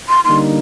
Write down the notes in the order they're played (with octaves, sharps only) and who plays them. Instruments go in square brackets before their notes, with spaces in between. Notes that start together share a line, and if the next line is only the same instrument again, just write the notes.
[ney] C6
[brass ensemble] D3 G3 A#3 D#4 [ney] C6